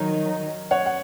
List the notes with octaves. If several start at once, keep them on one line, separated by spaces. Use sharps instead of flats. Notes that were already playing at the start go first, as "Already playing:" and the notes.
Already playing: D#3 F#3 D#4 A#4 C#5 D#5
C#5 F#5
F#5